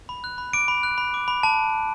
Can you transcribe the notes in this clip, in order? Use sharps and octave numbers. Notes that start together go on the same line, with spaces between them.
B5
F#6
B5
D6 D7
B5
F#6
B5
D6
B5
A5